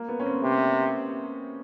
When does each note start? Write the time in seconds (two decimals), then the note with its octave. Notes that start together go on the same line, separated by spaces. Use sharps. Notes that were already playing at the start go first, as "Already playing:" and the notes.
Already playing: A#3
0.08 B3
0.20 C#4
0.26 C4
0.44 C3